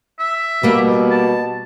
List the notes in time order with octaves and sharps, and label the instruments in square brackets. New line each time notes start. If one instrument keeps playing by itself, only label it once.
[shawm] E5
[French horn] B2 [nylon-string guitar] G3 A#3
[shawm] A5